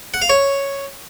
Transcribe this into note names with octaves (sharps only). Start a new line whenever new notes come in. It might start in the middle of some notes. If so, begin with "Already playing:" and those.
F#5
F5
C#5